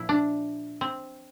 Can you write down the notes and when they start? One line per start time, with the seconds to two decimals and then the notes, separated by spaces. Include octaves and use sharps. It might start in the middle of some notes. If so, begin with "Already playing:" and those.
Already playing: A#2 F3 E4
0.09 D4
0.81 C4